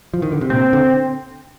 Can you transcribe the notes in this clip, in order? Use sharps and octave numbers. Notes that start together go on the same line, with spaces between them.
F3
D#3
D3
C3
A#2 C4
D3